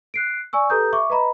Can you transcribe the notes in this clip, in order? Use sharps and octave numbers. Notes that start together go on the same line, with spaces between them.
F#6 C7 D7
D5 G#5 C#6 E6
G4 A4 B4 A#5 D#6 G6
E5 C#6 D6
B4 D#5 A#5 B5